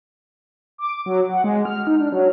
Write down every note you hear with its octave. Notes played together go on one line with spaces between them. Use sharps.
D6
F#3
F#5
G#3
F6
D#4
D4
F#3